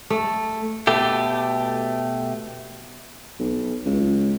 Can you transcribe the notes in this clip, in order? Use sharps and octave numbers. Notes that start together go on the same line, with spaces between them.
A3
B2 A3 G4
B1
C#2